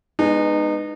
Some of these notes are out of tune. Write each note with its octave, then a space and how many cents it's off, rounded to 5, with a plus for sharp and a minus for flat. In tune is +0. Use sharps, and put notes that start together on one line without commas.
G#3 +0 B3 +0 D#4 -30